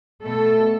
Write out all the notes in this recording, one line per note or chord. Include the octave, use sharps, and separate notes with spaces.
B2 A3 A4